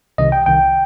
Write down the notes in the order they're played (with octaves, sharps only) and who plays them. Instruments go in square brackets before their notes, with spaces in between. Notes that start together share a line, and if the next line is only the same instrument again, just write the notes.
[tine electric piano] C2 C3 D#3 D#5
G5
C2 C3 D#3 G5